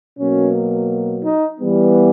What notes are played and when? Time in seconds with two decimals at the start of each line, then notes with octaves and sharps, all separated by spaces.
0.18 B2 F#3 A#3 C#4
1.24 D#4
1.59 E3 G3 B3